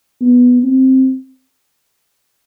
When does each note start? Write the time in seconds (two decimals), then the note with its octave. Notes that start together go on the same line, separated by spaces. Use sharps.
0.21 B3
0.63 C4